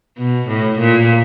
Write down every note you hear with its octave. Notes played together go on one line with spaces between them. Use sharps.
B2
A2
A#2